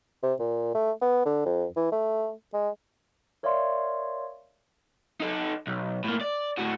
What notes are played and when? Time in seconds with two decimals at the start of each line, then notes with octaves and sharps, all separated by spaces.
0.23 C3
0.39 A#2
0.75 A3
1.02 B3
1.25 D3
1.45 F2
1.76 E3
1.92 A3
2.54 G#3
3.43 A#4 C#5 D5 E5 F5 C6
5.20 D#4 A4
5.67 B1
6.04 A2 A#3
6.21 D5
6.58 A2 F#4